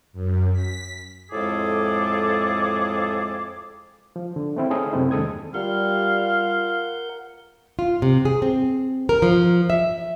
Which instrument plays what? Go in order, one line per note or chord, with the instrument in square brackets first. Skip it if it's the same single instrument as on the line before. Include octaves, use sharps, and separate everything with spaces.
[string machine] F#2
B6
[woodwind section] F2 A2 G#3 G#4 A4 D6
[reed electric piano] F3
D3
A3 C4 E4
C#4 D#4 G#4 A4 D#5
F#2 C3 A3 C4 E4
D#2 D3 G#3 A4 D#6 G#6
[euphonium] G3 [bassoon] F4 [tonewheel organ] A#4 F#5 G6 [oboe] F5
[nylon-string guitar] F4
C3
G#4
C4
A#4
F3
E5